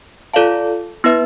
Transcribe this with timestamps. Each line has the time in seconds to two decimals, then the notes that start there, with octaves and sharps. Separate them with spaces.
0.34 F4 A4 D5 F5 A5
1.04 B3 E4 B4 E5